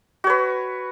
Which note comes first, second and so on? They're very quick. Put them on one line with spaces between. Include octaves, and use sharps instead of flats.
F#4 C#5 B4